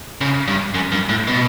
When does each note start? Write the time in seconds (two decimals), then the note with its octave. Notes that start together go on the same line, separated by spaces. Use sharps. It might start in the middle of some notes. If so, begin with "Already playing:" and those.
0.21 C#3
0.48 G2
0.74 F#2
0.92 G2
1.09 A2
1.27 B2